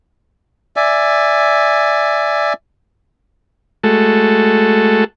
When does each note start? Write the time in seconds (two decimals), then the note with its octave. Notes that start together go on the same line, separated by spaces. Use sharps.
0.76 D5 E5 G#5
3.84 G#3 A3 F#4 A4